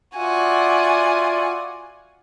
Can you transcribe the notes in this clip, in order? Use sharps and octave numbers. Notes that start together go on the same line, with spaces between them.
F4 F#4 D5 E5 G#5